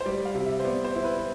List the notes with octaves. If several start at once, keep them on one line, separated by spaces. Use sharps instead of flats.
C5
G3 D5
F5
C3
E5
C5
B3 D5
C5
E4
B4